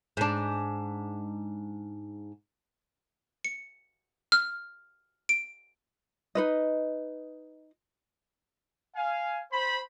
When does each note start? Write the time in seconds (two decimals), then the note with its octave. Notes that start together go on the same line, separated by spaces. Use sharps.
0.17 G#2 D4
3.45 C#7
4.32 F6
5.29 D7
6.35 D#4 B4 D#5
8.96 F5 G#5
9.51 C5 B5